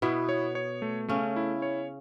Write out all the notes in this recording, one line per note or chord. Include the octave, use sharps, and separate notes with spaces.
B2 B3 E4
C#5
C#5
A3
C#3 A3 C#4
E4
C#5